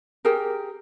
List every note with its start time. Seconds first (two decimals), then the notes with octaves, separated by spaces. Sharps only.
0.25 G4 G#4 A#4